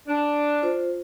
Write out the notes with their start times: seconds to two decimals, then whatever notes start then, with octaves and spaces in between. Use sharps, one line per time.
0.08 D4
0.63 F4 C5